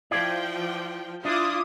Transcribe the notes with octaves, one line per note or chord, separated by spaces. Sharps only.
F3 E4 F4 D5 G5
D4 E4 F4 D6 D#6